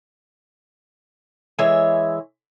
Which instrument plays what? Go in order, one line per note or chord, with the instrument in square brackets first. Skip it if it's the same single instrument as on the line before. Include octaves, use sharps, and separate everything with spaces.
[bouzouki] E3 G#3 C#5 E5